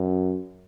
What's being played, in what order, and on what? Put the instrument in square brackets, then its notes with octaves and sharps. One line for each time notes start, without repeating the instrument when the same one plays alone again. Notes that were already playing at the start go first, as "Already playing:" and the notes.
Already playing: [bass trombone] F#2